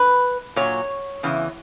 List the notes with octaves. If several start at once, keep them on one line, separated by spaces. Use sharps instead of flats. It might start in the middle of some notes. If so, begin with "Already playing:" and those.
Already playing: B4
A#2 F#3 C#5
E2 C#3 E3